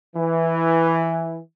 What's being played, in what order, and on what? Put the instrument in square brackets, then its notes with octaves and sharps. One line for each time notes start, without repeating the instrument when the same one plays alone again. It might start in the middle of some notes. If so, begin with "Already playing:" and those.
[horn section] E3